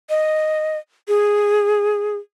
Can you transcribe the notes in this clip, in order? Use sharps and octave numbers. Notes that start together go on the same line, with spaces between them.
D#5
G#4